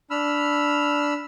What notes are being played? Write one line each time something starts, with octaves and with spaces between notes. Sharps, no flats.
D4 B5 E6 F6